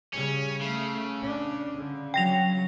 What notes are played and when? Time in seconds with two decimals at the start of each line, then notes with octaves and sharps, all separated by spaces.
0.13 C#3 G3 C#4
0.61 C#3 A3
1.23 D4
1.75 D3
2.14 F#3 G5 A#6 F7